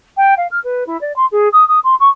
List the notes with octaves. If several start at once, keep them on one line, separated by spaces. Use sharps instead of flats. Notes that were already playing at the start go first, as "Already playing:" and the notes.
G5
F5
F6
B4
E4
D5
C6
G#4
D#6
D#6
C6
C#6